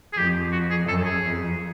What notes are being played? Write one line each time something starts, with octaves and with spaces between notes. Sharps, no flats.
G#4
F2 G4
F#4
G#4
F#2 A4
G#4
F2